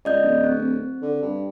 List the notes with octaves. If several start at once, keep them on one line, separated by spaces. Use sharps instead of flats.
C#2 D5 D#5 G6
D1
C4
D3
G2